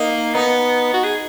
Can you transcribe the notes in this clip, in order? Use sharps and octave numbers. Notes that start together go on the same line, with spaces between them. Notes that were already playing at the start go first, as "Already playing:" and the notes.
Already playing: A#3 D#4
B3 D#4
F#4
G#4